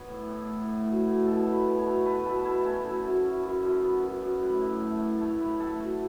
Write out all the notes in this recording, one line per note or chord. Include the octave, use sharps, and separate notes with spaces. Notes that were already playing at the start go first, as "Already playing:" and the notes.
Already playing: B3 C#5
A2
A2
A2
A2
F#3
A2
B2 A4
A3
B4
B2
C#5
A3
A3 B4
B2 A4
A3 E4
A3 C#4
F#3 E4
F#2
F#2
F#2
F#2
B3
F#2
F#2
A2 B4
A2
A3
A2
A3 C#5
A2 B4
A2 A4
A3 F#4